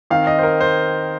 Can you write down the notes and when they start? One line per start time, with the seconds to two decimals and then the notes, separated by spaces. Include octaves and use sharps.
0.10 D#3 C4 D#4 F5
0.27 D#5
0.39 C5
0.43 A#4
0.60 C5